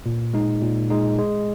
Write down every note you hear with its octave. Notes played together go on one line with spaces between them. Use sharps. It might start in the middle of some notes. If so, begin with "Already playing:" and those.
A#2
G#3 D#4
A#2
G#3 D#4
G#3